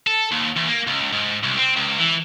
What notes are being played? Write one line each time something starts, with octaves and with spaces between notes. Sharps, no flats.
A4
D#2
E2
A#3
C#2
G#2
C2
C4
C#2
E3